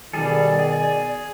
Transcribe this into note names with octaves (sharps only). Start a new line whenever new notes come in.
B2 D#3 G3 G#4 A4 D5
G#4